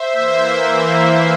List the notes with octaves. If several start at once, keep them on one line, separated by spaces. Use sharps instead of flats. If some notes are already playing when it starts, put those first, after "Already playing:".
Already playing: C5 E5
E3 A#3